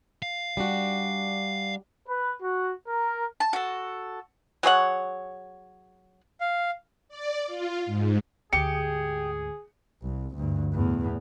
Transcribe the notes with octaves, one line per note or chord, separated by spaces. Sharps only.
F5
G3 D4 F#4
B4
F#4
A#4
A5
F#4 A4
F#3 G#4 C#5 F#5
F5
D5
F4
G#2
D2 G#2 G4 G#4 C#7
C2
D2 G2
E2 A2